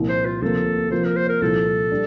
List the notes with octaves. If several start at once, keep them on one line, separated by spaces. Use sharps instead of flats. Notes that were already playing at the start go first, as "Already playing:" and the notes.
Already playing: C2 A#2 F3
C5
F4
D2 C3 F3 A#3 A4
C3 F3 A#3 F4 C5
A#4
C5
A#4
C2 A#2 F3 A4
G3 D4